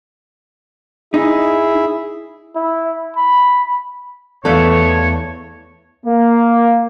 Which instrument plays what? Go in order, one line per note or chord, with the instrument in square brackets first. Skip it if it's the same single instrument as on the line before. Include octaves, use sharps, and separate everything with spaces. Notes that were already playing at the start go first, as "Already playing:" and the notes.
[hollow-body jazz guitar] D#4 [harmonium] E4 G#4 E5
[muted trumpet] E4
B5
[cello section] E2 [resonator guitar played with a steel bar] A3 A4 [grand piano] B3 D5 F5 [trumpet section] C#5
[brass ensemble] A#3